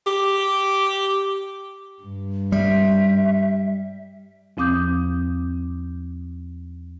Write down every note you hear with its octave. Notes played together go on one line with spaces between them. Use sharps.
G4
G2
G3 E5
E2 F3 C4 D6 D#6 G6